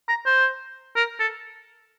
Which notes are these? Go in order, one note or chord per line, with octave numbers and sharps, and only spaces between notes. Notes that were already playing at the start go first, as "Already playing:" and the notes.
A#5
C5
A#4
A4